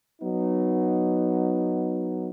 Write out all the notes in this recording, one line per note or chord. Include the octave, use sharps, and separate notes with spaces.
F#3 B3 D#4